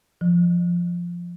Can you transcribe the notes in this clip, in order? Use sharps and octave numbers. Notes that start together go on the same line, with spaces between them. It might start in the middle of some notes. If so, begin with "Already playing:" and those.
F3